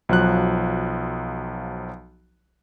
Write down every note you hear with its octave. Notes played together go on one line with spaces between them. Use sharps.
B1 F3 F#3 F#6